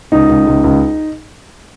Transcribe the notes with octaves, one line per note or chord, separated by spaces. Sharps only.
C#2 D#4
C#2
C#2
C#2